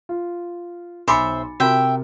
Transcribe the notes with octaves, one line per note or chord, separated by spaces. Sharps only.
F4
B1 C5 E5 G#5 B5 D6 A6 C#7
C3 F4 F#4 A#4 E5 G5